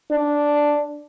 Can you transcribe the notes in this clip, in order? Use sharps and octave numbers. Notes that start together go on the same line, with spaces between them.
D4